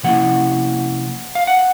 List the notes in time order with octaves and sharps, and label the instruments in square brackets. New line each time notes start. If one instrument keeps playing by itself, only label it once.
[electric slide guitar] C3 F3 A#3 C#4 E4 F#5
F5
F#5